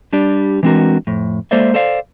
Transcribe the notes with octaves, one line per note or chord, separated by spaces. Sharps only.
G3 D4 G4 D5
E3 G#3 C4 D4 F#4 A#4
F2 A2
G#3 A#3 A4 C5 D5 E5
A4 C5 D5 F5